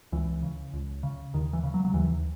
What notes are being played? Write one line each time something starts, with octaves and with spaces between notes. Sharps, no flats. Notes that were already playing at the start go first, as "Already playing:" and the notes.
C#2 E3
C#3
C#2
C#3
D#2 D#3
E3
C#3
F#3
F#3
D#2 E3